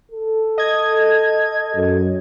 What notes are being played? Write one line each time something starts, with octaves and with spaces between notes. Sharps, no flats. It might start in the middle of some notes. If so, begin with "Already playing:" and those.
A4
D#5 G#6
F#2